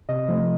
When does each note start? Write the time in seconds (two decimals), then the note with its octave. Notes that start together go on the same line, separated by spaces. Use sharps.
0.09 C3 D#5
0.28 F3 A3